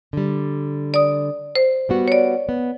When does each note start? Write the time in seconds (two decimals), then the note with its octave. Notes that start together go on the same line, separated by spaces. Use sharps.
0.13 D3 G3
0.94 D5 D#6
1.55 C5
1.89 G3 B3 F#4
2.08 C#5 D5
2.49 B3